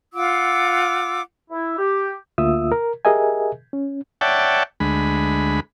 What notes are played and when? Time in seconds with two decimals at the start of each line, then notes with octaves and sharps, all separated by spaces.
0.13 F4 F#5 D6 E6
1.51 E4
1.78 G4
2.38 D2 A#3 F4 E5 D#6 E6
2.72 A#4
3.05 G4 G#4 A#4 D#5 E5 G#5
3.73 C#4
4.21 C#5 D5 E5 F#5 G5 A5
4.80 D2 G#3 B5